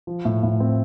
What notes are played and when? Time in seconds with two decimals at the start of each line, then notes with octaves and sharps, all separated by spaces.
0.07 F3
0.25 A2
0.43 A2
0.60 C4